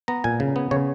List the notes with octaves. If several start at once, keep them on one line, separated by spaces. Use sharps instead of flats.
B3 A#5
A#2 G#5
C#3
B3
C#3 C#5